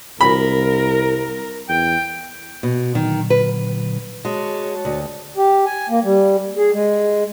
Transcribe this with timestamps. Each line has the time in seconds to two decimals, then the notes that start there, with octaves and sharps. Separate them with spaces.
0.21 C2 A#4 B5
1.69 E2 G5
2.63 B2
2.95 A#2 D3 D#3 F#3
3.30 B4
4.25 G#3 F#4 C#5 A5
4.85 D2
5.37 G4
5.66 G#5
5.89 A#3
6.03 G3
6.57 G#4
6.73 G#3